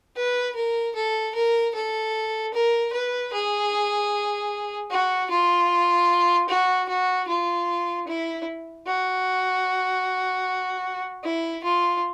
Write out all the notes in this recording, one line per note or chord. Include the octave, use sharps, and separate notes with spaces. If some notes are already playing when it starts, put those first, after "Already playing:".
B4
A#4
A4
A#4
A4
A#4
B4
G#4
F#4
F4
F#4
F#4
F4
E4
F#4
E4
F4